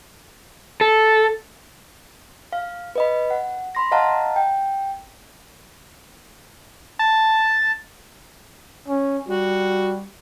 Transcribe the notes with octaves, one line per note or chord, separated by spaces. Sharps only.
A4
F5
B4 D#5 B5
F#5
B5 C6 A#6
D#5 F5 F#5 A5 A#5
G5
A5
C#4
G3 F#4